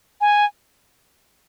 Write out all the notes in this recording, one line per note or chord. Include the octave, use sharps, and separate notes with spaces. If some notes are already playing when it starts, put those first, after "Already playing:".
G#5